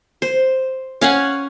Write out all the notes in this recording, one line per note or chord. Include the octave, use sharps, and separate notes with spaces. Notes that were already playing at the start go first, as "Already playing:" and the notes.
C5
C#4 F5 F#5 G#5